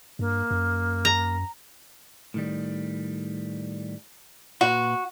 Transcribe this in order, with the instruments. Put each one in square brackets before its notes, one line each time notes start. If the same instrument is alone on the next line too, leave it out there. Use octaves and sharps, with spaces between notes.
[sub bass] G2 [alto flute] A#3
[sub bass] F#2
[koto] A#5
[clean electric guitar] A2 D#3 G3
[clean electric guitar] A#2 B4 C6 [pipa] F#4